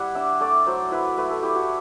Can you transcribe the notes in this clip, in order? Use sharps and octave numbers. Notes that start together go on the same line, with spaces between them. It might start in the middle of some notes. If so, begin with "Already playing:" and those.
Already playing: G3 E4 F#5
D4 E5
A3 D5
F#3 C5
E4 B4
A3 B4
A4
E4 G4
F#4